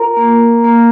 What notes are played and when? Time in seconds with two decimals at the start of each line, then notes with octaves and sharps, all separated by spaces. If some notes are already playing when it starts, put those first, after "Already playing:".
Already playing: F4 A#4 A#5
0.17 A#3
0.64 A#3